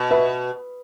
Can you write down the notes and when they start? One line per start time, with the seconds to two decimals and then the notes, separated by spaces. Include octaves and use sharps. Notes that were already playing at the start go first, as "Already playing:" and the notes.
Already playing: B2
0.11 B4 E5